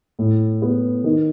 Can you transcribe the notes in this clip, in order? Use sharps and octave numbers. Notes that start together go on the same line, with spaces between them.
A2
B3
D#3